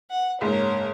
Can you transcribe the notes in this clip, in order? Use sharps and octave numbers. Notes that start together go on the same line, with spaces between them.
F#5
F#1 G#2 A#4 C#5